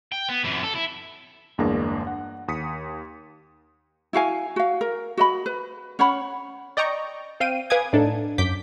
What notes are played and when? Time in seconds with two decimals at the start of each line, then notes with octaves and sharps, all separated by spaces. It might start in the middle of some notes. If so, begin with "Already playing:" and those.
0.12 G5
0.29 B3
0.44 F#2 E3
0.63 A4
0.75 E4
1.58 G1 E2 G#3 A#3 D4 A#6
2.07 F#5
2.48 D#2 D#6 B6 C#7
4.13 E4 F#4 F5 G#5
4.56 F#4 F5
4.81 A#4
5.17 F#4 D#5 B5
5.46 B4
5.99 C#4 C#5 F#5 B5
6.77 D5 D#5 G5 A#5 C#6
7.40 C4 F5 G5 D#7
7.70 B4 F5 G#5 D6 D#6 G#6
7.93 A2 D4 D#4 A4
8.38 F#2 D6 G6 B6